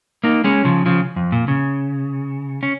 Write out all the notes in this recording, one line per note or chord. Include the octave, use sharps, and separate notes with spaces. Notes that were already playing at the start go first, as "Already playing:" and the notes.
A#3 D#4
G#3 C#4
C#3 F3
C#3 F3
F2
A#2
C#3
C#4